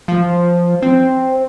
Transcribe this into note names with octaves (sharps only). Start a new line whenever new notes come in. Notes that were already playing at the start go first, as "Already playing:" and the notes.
F3
C4